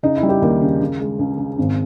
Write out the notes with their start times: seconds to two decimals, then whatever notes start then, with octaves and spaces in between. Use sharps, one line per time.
0.03 C#3 D#4
0.17 E4
0.23 G3
0.29 G4
0.42 D#2 A#4
0.62 C#3
0.81 C#3
1.01 G#3
1.19 C#2
1.38 C#3
1.58 G#1